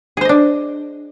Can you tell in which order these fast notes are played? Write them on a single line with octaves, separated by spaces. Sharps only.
G#4 C5 D#5 D4